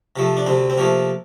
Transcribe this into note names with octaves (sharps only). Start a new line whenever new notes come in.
C3 F3 A3
D4
D2 C3 C4
C4
C3 F3 A3 A#3